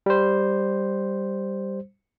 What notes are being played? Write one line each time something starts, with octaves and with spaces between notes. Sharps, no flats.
G3 C5